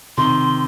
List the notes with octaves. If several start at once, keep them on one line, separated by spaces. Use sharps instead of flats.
C3 D#3 C6